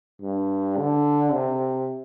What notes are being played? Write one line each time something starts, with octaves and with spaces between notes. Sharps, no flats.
G2
D3
C3